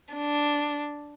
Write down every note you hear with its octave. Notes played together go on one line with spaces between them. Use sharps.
D4